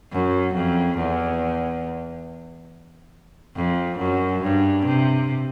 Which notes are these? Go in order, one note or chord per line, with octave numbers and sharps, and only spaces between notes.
F#2
F2
E2
F2
F#2
G2
C3